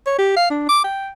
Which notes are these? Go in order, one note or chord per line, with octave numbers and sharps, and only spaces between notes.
C#5
G4
F5
D4
D6
G5